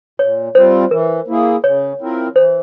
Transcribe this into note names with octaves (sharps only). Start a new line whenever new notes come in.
A#2 C#5
G3 C4 F4 C5
E3 A#4
A#3 E4 G#4
C#3 C#5
F3 C4 E4 A#4
E3 C5